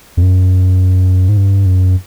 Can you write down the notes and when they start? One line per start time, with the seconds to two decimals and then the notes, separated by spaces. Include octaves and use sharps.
0.17 F2
0.22 F#2
1.29 G#2
1.37 G2
1.66 F#2